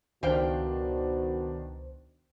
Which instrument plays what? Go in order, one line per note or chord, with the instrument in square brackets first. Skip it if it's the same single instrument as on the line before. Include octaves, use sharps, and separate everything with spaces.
[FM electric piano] C#2 C5 [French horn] B2 [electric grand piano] D#3 D4 [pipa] G4 F5 G5